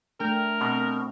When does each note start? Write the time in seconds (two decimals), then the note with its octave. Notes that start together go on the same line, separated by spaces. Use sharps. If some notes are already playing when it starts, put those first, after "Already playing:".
0.20 A3 D4 A#4 G5
0.61 B2 C4